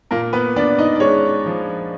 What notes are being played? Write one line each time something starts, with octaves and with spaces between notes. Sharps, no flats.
A#2 A#3 A#4
B3 B4
B3 D4 D5
D#4 D#5
D5
G#3 C#4 C#5
F3